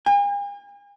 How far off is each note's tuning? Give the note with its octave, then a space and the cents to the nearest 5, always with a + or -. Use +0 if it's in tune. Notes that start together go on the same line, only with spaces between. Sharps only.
G#5 -45